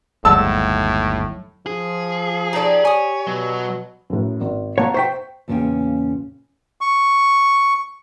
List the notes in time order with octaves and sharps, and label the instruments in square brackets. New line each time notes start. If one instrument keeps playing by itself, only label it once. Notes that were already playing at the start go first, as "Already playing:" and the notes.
[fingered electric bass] G1 D#2 G#3 [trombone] A2 [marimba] F#3 [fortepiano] A5 E6
[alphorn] F3 [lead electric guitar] G#4
[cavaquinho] D#4 A4 C#5 [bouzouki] G4 D5
[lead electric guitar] C#5 [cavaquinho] G#5 D#6
[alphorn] B2 [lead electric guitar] F#3
[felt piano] F#2 A2
G#1
[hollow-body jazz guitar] A#3 C#5 [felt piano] F#5 A5 A#5
[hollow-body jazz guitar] C5 E5 G5 [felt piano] C#6 B6
[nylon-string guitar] E2 A#2 C#3 A#3 C#4 G5
[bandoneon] C#6